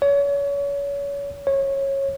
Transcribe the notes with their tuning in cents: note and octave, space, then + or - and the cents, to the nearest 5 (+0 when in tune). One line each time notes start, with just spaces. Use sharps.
C#5 +30
C#5 -20